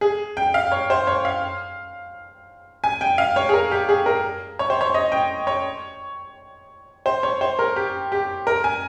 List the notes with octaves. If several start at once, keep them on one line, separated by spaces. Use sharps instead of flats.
G#4
G5
F5
C#5
C5
C#5
F5
G#5
G5
F5
C#5
G#4
A#4
G4
G#4
A#4
C#5
C5
C#5
D#5
G5
C#5
C5
C#5
C5
A#4
G4
G4
A#4
G#5